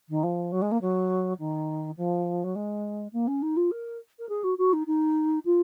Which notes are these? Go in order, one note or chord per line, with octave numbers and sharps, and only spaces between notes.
D#3
F3
F#3
G#3
A#3
F#3
D#3
F3
F#3
G#3
A#3
C#4
D#4
F4
A#4
A#4
G#4
F#4
F#4
D#4
D#4
F4